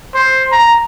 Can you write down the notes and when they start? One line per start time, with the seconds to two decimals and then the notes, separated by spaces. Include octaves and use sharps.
0.15 C5
0.52 A#5